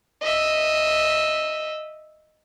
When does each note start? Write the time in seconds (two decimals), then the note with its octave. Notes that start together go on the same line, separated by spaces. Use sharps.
0.22 D#5 E5